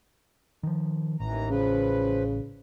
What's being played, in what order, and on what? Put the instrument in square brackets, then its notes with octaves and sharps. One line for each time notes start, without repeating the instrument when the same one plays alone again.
[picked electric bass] D#3 F3
[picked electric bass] A1 [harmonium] D#2 E3 A#5
[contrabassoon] C#3 [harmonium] F3 B4